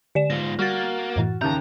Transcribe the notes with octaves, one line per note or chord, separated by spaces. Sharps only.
D3 G4 D5 E7
G#2 F4 A#6
G3 A#3 F#4 F6 A6
F#2 A2 E3
D#2 C#3 E5 A5 A#5 G6